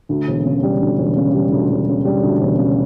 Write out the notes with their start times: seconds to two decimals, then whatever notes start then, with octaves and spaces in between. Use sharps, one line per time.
0.09 D2
0.28 E1
0.45 C#3
0.63 G3
0.81 D2
0.99 E1
1.16 C#3
1.34 G3
1.52 D2
1.70 E1
1.88 C#3
2.05 G3
2.23 D2
2.41 E1
2.58 C#3